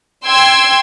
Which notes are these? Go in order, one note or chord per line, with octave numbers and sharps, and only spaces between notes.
G5 C6 E6 G#6